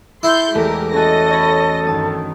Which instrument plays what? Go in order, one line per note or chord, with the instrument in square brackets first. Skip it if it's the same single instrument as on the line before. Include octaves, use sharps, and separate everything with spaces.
[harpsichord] E4 [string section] A4 C6 G6
[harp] E2 A3 [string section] G#3 G4 A#4
[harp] C#4 F#4 [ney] A4 [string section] D#5 A#6
[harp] C#5 B5
[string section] G2 D#3 [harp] A5 D#6 A6